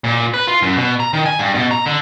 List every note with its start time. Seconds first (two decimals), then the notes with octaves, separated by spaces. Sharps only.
0.04 A#2
0.34 B4
0.47 F4
0.62 F#2
0.76 B2
1.00 A#5
1.13 D#3
1.26 G#5
1.39 G2
1.55 B2
1.71 A#5
1.86 D3